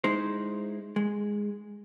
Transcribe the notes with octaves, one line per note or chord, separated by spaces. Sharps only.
G#3 D#4 E4 C5
G#3